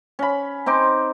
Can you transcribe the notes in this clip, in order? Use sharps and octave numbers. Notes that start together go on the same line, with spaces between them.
C#4 B5
C4 D#4 C6 D6